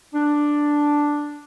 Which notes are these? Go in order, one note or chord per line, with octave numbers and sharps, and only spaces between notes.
D4